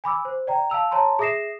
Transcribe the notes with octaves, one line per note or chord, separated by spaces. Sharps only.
G#5 B5 D6 E6
C5
D5 G5 A#5
F5 A5 E6 F7
C#5 A5 A#5 C6
G#4 E5 D#6 A#6 C7 E7